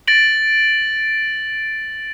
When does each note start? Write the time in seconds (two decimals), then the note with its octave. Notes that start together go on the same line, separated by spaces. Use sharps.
0.08 A6 A#6 D7 F#7